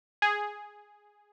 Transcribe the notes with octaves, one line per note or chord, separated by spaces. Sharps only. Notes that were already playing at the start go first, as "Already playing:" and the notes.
G#4